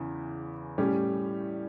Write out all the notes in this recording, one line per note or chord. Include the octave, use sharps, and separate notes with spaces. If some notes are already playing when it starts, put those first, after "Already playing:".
Already playing: E2 C#3 E3
A2 G3 C#4 G4